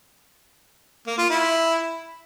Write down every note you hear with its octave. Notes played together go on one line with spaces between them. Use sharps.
A#3
F4
E4